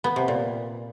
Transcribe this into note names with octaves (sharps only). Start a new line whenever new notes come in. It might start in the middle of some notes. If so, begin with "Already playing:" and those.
B3
C3
A#2